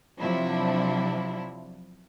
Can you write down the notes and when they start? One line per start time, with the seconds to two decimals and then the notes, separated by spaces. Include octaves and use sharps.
0.20 C3 F3 F#3 D4 E4